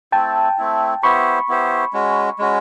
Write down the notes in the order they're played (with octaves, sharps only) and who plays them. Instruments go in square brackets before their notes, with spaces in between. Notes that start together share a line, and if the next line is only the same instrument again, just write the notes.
[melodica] A3 C4 E4 [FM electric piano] G5 A5
[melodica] A3 C4 E4
[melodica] B3 E4 G4 C5 [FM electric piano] B5 C#6
[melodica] B3 E4 G4 C5
G#3 C#4 F#4
G#3 C#4 F#4